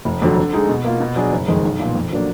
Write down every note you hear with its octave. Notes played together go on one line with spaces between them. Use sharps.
F1
F2 D3 F#3
D3
G#3 D#4 G#4
B2
A#3 F4
B2
F#3 D4 G#4
F#1
F2 D#3 G#3
B1
A#2 F3 B3 F4
F2
D3 F#3 A#3 D4